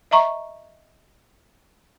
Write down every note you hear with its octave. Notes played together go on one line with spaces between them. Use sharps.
D#5 E5 A#5 C#6